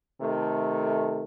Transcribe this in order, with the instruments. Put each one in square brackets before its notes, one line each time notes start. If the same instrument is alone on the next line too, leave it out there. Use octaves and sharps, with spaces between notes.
[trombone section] C3 D#3 A3